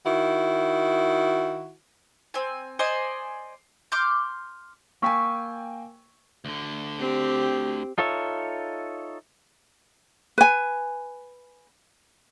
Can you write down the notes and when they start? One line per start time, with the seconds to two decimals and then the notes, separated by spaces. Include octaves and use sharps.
0.06 D#3 E4 F#4
2.34 C4 G#5
2.79 C5 D5 D#5 G#5
3.92 C6 D6 F6 G6
5.02 A#3 G5 G#5 C#6 E6 B6
6.45 D2 D3
6.99 C4 G4
7.98 D#4 F4 A4 C#5 E5
10.38 B4 G#5